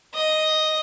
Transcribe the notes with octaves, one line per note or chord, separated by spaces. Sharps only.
D#5